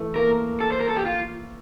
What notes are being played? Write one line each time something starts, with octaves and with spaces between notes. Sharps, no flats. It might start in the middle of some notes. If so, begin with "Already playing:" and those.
Already playing: E3 A3
A#3 A#4
A4
C5
A#4
A4
G4
F4